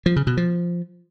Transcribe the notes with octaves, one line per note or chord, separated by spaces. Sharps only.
F3
C#3
B2
F3